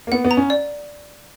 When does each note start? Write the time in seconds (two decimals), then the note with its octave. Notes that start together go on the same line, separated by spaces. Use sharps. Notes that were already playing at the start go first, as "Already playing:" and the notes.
0.07 A#3
0.12 B3 F#5
0.24 B3
0.31 A#5
0.37 C#4
0.50 D5